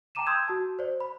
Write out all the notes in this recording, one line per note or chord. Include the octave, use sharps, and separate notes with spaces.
G5 A5 A#5 D6 D#7 E7
C6 D#6 E6 G6 G#6
F#4 A5
C5 D5
B5